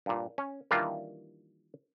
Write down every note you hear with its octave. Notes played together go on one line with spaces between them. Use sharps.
G2 A#2
C#4
D#3 E3 G3 A#3 D4 F4